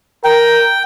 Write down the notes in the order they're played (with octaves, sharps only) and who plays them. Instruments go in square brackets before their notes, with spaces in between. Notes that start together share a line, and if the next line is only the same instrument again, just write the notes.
[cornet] A#4 [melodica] G5